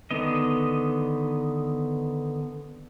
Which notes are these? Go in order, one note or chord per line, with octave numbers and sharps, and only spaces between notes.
D3 D#3 B3 D#5